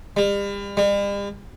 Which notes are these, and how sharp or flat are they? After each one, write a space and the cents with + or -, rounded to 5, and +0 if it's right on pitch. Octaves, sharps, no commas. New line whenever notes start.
G3 +40
G3 +45